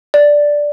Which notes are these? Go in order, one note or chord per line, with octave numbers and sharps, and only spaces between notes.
D5